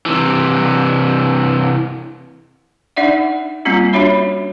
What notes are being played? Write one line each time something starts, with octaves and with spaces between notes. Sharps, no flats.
C3 E3
D4 D#4 D5 E5 F#5
G3 A#3 C4 C#4 F4
D4 F#4 C#5 E5 B5